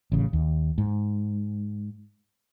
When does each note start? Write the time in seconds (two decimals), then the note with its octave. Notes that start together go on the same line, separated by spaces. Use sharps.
0.12 A1 C#3
0.33 D#2
0.78 G#2